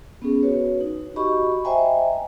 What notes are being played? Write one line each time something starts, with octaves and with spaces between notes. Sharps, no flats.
B3 C#4 G#4
F#4 B4 C#5
D#4
F#4 G4 D#5 B5 C#6
C5 D#5 E5 G5 G#5 A#5